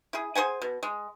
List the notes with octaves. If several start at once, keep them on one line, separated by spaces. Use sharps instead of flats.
E4 G#4
G#4 C5 F#5 G#5
B2
G#3